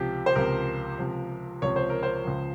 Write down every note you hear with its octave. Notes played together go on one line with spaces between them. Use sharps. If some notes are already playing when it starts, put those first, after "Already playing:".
Already playing: C#2 C3 F3 G4
C5
C#2 C3 F3 A#4
C#2 C3 F3
C#2 C3 F3 C#5
C5
A#4
C5
C#2 C#3 F3